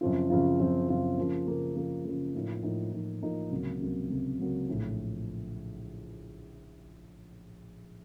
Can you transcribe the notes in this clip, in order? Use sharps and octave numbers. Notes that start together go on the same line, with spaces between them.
F#2 C#3 F3 C4 F4
F#2 C#3 F3 C4 F4
F#2 C#3 F3 C4 F4
F#2 C#3 F3 C4 F4
C#3 F3 A#3
C#3 F3 A#3
C#3 F3 A#3
C#3 F3 A#3
A2 F3 A#3 D#4
A2 F3 A#3 D#4
A2 F3 A#3 D#4
A2 F3 A#3 D#4
C#2 C3 F#3 A#3
C#2 C3 F#3 A#3
C#2 C3 F#3 A#3
C#2 C3 F#3 A#3
A#1 A2 F3 A3